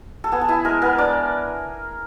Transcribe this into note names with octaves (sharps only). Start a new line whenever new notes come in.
A4
B3 G#4
A4
E4 G#4
G#3 A#4
B3 A#4
D4 D5